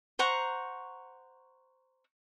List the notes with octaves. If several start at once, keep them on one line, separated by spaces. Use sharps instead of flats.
C5 F#5 A#5 C#6